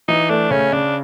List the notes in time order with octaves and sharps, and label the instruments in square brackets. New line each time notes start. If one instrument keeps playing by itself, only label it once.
[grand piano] E3 [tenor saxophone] D#4
[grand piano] A3 [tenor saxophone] D4
[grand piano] C#3 [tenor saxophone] C#4
[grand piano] C#3 [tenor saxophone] D4